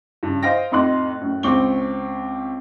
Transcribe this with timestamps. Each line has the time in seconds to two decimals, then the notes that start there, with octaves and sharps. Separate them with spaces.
0.23 G2 C#3
0.43 C5 D#5 F5 G5 A#6
0.72 F2 A2 D#4 C6 F#6
1.21 F#2 A2
1.43 C#2 C4 C#6 D6 G7